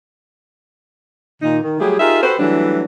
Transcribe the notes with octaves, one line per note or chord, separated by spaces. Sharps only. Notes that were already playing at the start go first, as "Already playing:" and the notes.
A#2 D#3 D#4
D#3
F#3 G3 A3 G4 G#4
D#4 F4 G4 G#4 A#4 E5
F#4 G4 A4 B4 C5
E3 F#3 G3 A3 D4